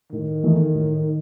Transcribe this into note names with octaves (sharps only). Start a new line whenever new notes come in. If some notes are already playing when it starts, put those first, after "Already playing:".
A2 D#3
E3 A3 D#4
A2